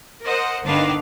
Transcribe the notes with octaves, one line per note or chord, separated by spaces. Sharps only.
A#4 C5 D#5 F#5
G1 D3 D#3 D4 B4 F5